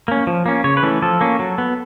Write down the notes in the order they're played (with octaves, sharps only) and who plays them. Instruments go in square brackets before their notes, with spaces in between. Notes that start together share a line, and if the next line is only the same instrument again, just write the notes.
[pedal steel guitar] A#3 C#4
F3
A#3 C#4
C#3 C#5
B4
E3 A3 C#4
F3 A4
A#3 C#4
F#3
B3